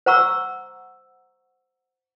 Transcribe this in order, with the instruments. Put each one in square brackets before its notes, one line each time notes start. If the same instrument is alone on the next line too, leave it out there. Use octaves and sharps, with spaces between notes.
[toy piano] C5 F#5 A#5 C#6 E6